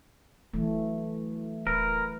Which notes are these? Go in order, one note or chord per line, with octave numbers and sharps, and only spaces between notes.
E1 E3 F#3 A3
D1 A#4 B4